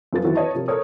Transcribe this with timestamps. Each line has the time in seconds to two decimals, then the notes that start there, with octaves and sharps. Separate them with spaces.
0.13 F#2 F3 B3 A6
0.24 D#3 E3 F#3 B3 F#4
0.35 B4 C#5 D#5 A5
0.54 C3 F3 A#4
0.68 A4 A#4 C5 C#5 D#6